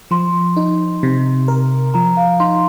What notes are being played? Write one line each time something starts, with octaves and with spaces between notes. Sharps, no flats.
F3 C6
D#4
C3
A#4
F3 A#5
F5
D#4 C6